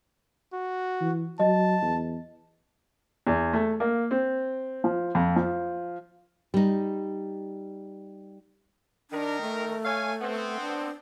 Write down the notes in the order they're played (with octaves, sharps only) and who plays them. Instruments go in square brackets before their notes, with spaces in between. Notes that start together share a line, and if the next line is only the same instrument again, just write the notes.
[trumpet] F#4
[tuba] E3
[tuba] F#3 [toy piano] D#5 [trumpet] A5
[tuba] E2
[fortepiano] E2
A3
A#3
C4
F3
F2
F3
[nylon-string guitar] G3 D#4
[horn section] D#3 A#4 [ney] D4
[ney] A3
[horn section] C#5 F5 G#5
B3 C4
[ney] D4